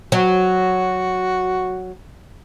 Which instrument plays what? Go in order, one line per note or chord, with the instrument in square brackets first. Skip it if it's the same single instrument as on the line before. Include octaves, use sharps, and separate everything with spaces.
[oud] F#3 [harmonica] F#4